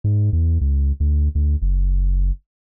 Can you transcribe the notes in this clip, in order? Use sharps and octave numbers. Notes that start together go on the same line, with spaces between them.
G#2
E2
C#2
D2
D2
F#1